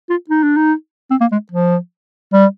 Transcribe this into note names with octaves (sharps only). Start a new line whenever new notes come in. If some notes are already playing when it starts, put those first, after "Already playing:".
F4
D#4
D4
D#4
C4
A#3
G#3
F3
G3